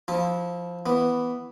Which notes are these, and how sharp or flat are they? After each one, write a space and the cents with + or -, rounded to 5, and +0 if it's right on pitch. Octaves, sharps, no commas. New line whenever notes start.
F3 +0 E4 -30 A5 +0
E3 +0 B3 +0